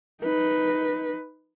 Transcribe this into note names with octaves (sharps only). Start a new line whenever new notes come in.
D#4 B4